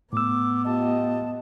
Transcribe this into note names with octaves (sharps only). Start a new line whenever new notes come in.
A2 B3 D6 E6
F4 G4 D#5 A5